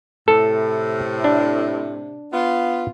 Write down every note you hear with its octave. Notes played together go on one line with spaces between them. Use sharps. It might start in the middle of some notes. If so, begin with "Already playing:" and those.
A2 C3 A4
D4
B3 F4